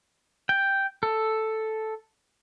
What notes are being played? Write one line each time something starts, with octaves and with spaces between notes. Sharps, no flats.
G5
A4